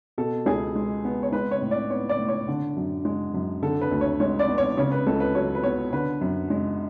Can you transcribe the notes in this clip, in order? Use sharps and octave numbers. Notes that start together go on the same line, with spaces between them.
B2 A4
C#2 G#4
G#3
B3
C#5
G#3 B4
C#5
A2
D5
B3 C#5
D5
A2
C#5
D3
F#2
G#3
F#2
D3 A4
B4
D2
C#5
G#3 C#5
D5
B3
C#5
C#3 C#5
B4
C#2 A4
B4
F#3 C#5
B4
B3 C#5
D3 B4
F#2
G#3